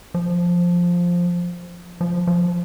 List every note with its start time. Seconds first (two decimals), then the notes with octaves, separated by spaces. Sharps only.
0.14 F3
2.01 F3
2.27 F3